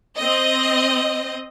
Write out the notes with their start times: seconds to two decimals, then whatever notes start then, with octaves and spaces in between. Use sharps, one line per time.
0.17 C4 D#5